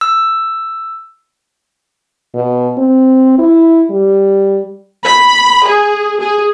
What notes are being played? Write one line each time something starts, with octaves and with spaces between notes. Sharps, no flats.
E6
B2
C4
E4
G3
B5
G#4
G#4